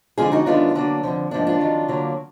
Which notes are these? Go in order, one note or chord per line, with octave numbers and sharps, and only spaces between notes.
F2 D3 G#3 F4 G#4
D#4 F#4
F#2 D#3 G#3 B3 D4 F4
D3 F#3 A#3 D4
F2 D3 F3
G#2 F3 A#3 D4
D4 F4
F2 D#3 F#3
D3 F#3 A#3